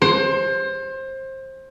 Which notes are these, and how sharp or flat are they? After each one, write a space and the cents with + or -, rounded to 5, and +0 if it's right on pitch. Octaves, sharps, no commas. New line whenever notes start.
C5 +25